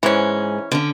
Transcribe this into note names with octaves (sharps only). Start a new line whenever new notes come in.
G#2 E3 G#3 C#4
D3 C#4